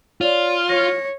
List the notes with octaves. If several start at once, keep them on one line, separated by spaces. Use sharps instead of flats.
F4 C#5 D5
C#5 A#6